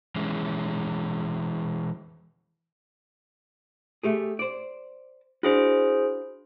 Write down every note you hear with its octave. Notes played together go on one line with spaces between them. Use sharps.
E3 G#3 C#4
A3 G4 G#4
C5 D5
D4 E4 F#4 G#4 C5